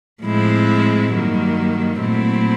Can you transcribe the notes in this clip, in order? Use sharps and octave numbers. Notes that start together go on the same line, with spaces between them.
A2 F3 G#3 C4 E4
G2 D#3 F#3 A#3
A#2 F#3 A3 C4 E4